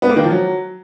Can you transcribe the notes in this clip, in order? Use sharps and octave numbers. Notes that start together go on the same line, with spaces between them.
B3
A#3
D#3
F3
F#3